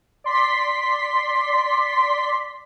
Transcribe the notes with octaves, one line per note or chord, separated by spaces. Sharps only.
D5 C6 B6